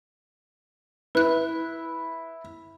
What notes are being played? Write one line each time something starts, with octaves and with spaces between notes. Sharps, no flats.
E4 B4 F#6